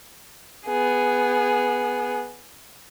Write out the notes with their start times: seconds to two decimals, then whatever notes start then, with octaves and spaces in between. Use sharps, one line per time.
0.66 B3 G#4